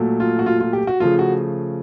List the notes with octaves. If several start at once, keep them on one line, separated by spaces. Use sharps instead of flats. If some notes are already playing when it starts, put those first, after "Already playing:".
Already playing: A#2 F#3 A3
F4
F#4
F4
F4
G4
F#4
C#3 F3 A3 F4
F#4